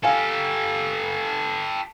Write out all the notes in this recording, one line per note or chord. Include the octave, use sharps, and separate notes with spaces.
G4 A4 F5 G#5